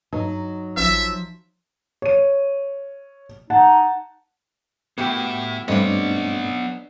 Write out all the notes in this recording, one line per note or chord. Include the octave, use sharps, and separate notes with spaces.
G2 F#3 D#4
A1 F3 E5
C#5 D#7
D#4 F#5 A5
A2 B3 E4 F#4 G4 B4 G5
G2 A3 B3 C4 D4 B4 C#5 D#5